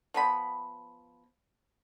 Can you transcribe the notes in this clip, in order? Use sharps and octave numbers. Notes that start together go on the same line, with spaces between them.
F3 B3 B5